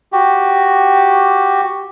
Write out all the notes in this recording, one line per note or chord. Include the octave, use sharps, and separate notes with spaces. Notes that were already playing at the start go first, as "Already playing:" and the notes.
F#4 G4